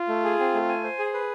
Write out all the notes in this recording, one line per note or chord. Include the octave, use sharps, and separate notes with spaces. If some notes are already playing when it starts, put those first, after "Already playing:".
Already playing: F4
A3
G#4
C4
A3
G#5
C5
G#4
B4